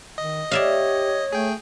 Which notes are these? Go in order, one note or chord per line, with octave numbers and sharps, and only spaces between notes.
D#3 D#5
G4 C#5 D5 E5 F5
A3 G#4 G5